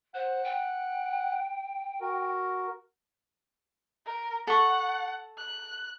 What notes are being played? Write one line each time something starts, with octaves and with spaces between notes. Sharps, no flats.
C5 F#5 F#6
G5
F#4 A#4
A#4
A4 F#5 C#6
F#6